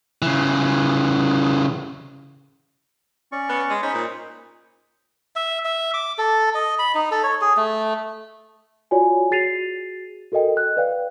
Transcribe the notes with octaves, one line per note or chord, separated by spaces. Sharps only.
C#3 E3
C#4 D5 C#6
B3
G#3
C#4 D#4 C5 B5
A#2
E5
E5
D6
A4
D#5
B5
D#4
A4
C#5
G#4
A3
F4 F#4 C#5 D5 G#5
F#4 G#4 A6 C7 D#7 F7
F#4 A4 A#4 D#5 G5
F#6
B4 D5 F5 G5